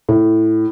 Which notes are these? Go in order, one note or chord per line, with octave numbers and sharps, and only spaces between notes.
A2